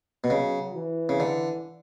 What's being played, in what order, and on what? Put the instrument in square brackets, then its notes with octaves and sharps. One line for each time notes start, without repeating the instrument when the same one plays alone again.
[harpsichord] B2
[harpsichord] C#3 [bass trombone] F#3
[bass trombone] E3
[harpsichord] C#3
D3